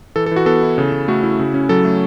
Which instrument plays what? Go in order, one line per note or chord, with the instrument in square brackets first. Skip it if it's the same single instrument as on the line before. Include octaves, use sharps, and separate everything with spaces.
[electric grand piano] E3 A4
A4
E3 F#4
B3 A4
E4
C#3
C#3
A3 F#4
E4
C#3
C#4
F#3 A4
A3